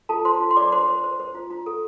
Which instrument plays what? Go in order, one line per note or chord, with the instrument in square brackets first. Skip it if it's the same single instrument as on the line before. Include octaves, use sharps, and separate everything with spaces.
[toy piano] F4 A4 A5
F4 C5 C6
F4
C6
C5 D5 D6
C5 C6
C5
C5
C5
F4
F4
A4